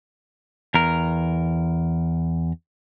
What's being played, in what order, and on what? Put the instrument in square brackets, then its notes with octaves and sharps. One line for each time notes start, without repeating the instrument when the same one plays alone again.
[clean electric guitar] E2 A#4